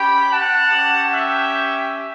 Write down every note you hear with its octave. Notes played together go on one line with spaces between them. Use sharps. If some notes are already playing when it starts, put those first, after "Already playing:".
Already playing: C#4 G4 G5 B5
F#5 A5
C#4 G4
E5 G5